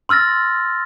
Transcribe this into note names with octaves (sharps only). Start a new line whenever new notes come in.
C6 E6 F6 A6 A#6